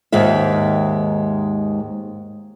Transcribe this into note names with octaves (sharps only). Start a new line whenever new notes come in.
D#2 G#2 D#3 G#3 E5